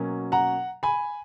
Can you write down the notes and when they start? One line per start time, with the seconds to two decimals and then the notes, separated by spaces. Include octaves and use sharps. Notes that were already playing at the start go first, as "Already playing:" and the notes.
Already playing: B2 F#3 A#3 C#4
0.32 F#5 A#5
0.83 G#5 B5